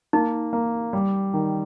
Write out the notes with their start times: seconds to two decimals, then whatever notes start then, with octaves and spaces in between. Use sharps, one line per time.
0.13 A#3 D#4
0.53 A#3
0.93 G3
1.34 D#3